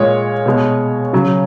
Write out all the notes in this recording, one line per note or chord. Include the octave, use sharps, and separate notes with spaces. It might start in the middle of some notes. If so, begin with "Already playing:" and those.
Already playing: A#2 G#3 C#5
B2 G#3
C#3 F#3